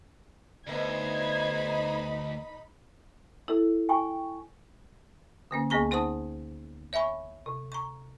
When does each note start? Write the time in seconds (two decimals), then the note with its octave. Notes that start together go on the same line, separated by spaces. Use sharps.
0.67 D2 B3 D#4 C5 B5 G#6
3.48 E4 A4
3.89 G5 G#5 C#6
5.51 D3 A#3 C#4
5.70 D2 A#3 B3 G#4 A#5 C#6
5.91 D#4 C5 F#5 A5 D#6
6.93 C#5 E5 G#5 B5 C#6
7.46 C3
7.72 A#5 C#6